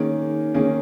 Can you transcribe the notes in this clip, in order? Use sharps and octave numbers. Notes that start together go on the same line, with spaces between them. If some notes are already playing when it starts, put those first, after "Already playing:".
Already playing: D#3 A#3 C#4 G#4
D#3 A#3 C#4 G#4